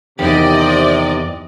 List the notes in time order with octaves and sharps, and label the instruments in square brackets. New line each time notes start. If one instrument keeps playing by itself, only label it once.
[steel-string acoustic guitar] E2 [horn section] C3 [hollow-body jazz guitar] D#3 G4 [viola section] D5 D#5